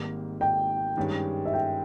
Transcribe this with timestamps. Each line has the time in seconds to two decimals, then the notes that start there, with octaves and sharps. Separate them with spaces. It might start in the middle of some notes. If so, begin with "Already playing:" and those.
Already playing: G#1 G#2 D#3 G3 A#3
0.41 G5
0.97 G2 D#3 G#3 C#4 G4
1.45 E5
1.53 G5